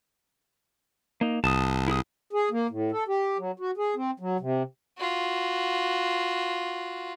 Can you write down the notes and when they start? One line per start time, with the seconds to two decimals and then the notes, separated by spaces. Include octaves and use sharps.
1.21 A#3 D#4
1.44 C2 A5 D#6
1.88 E4 G#4 D#6
2.33 G#4
2.51 A#3
2.70 A2
2.92 A4
3.08 G4
3.38 F#3
3.60 F#4
3.77 G#4
3.96 C4
4.20 F#3
4.40 C3
4.98 F4 F#4